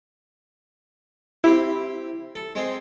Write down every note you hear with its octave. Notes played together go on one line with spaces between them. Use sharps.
C4 E4 G4
A4
G#3 C4